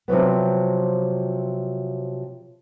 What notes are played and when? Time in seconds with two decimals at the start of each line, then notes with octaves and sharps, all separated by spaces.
0.08 C3 F3 F#3 B3